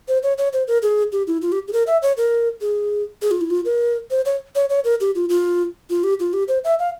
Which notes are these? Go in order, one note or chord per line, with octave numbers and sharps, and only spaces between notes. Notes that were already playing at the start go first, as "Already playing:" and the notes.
C5
C#5
C#5
C5
A#4
G#4
G4
E4
F4
G4
G#4
A#4
E5
C#5
A#4
G#4
G#4
F4
E4
F4
A#4
C5
C#5
C#5
C#5
A#4
G4
F4
F4
F4
G4
F4
G4
C5
E5
F5